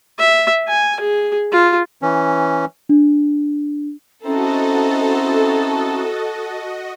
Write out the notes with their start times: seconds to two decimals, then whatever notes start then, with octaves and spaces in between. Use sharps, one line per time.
0.19 E5
0.68 G#5
1.00 G#4
1.52 F4
2.02 E3 C#4
2.89 D4
4.25 C4 C#4 E4 F#4 A4 D#5 A#5